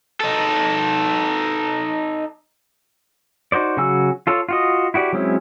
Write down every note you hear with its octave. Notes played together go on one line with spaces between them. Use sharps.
D#4 A4
D#4 F#4 C5 D5
C#3 F#3 F#4 G#5 E6
F4 A4 C#5
F4 F#4 D#5
E4 F#4 G4 D5
F#3 G#3 C4 C#4 E4